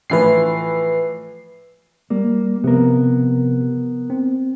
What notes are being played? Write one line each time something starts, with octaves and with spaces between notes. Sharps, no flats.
A2 E3 F3 B4 C7
G3 A#3
C3 F3 B3 A#4
C4